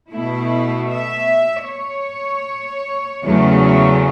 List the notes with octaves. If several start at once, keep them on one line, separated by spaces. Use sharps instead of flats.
B2 A3 E4
E5
C#5
E2 C#3 F#3 A3